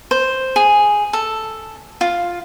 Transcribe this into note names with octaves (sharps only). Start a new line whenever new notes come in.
C5
G#4
A4
F4